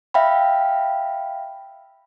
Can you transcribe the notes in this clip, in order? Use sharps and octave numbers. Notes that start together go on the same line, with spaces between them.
E5 F5 G5 B5